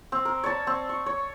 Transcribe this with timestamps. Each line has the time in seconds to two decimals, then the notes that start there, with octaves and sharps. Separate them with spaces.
0.12 C4
0.25 A#4
0.44 C#5 D5 A5 B5
0.67 C4
0.89 C#6
1.06 C#5